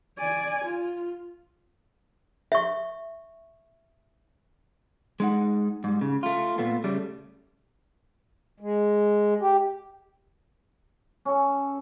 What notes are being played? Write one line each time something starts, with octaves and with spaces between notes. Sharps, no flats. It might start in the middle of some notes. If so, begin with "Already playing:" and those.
D5 G#5
F4
E5 C#6
G#3 D#4 F#5
G#2 G3
C#3
A3 F4
A#2 A3 B3 F4
C#3 G3 A3
G#3
G4
C#4 A4